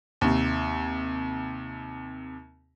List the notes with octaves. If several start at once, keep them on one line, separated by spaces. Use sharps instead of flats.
D#2 C3